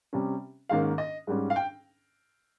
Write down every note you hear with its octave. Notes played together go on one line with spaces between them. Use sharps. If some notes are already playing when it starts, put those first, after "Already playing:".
C3 G3 C#4
G#2 D#3 A#3 C#4 F5
D#5
G#2 G3 C#4
F5
G5